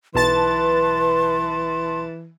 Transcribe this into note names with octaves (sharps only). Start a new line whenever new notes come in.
B1 E3 B4 A5 C6 A6